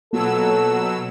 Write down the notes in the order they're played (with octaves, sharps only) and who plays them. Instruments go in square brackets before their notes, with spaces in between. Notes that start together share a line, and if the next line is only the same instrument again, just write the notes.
[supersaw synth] B2 F#3 E6 [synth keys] A#3 F4 F#4 [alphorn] A4